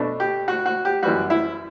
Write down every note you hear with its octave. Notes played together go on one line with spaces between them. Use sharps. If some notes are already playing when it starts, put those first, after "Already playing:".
Already playing: B2 A3 D4
G4
F#4
F#4
G4
F#2 E3 G3 F#4
E4